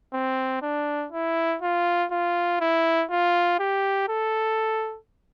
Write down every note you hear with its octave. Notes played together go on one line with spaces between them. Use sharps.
C4
D4
E4
F4
F4
E4
F4
G4
A4